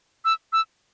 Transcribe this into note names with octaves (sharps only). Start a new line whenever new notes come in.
E6
E6